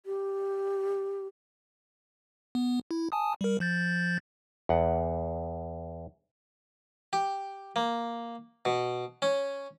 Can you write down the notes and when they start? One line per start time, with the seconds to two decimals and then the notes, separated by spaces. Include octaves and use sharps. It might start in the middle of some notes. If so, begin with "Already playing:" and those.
0.06 G4
2.55 B3
2.91 E4
3.12 G#5 A5 D#6
3.41 G3 A#4
3.60 F3 G6 A6
4.69 E2 F#5
7.13 G4
7.76 A#3
8.65 B2
9.22 C#4